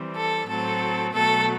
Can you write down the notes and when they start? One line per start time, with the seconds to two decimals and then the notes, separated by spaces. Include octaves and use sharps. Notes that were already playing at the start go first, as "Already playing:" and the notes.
Already playing: E3 G3 C4
0.15 A4
0.48 A2 F#3 C4 A4
1.12 B2 F#3 A3 A4